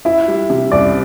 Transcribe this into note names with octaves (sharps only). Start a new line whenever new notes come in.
E4 E5
G3
C3
C2 D5